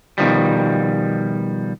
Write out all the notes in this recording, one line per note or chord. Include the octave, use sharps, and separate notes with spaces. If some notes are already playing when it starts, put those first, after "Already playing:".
B2 D#3 F3 G3